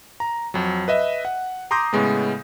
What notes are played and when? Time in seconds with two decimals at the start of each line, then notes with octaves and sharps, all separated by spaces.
0.20 A#5
0.54 F2 F#3
0.88 B4 D#5 E5
1.25 F#5
1.71 A#5 C6 D6 D#6 G6 A#6
1.93 A2 C#3 G#3 B3